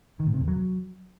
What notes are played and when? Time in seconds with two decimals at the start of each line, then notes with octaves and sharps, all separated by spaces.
0.20 D#3
0.27 A2
0.34 C3
0.41 E2
0.48 F#3